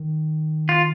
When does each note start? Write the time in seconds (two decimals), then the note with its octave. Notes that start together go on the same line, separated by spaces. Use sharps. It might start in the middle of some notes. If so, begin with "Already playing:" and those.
Already playing: D#3
0.69 F4